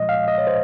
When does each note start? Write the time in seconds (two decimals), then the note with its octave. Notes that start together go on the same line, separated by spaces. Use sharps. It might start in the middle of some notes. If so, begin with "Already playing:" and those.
Already playing: A#2 F3 G#3 D#5
0.09 F5
0.28 D#5
0.38 C#5
0.47 C5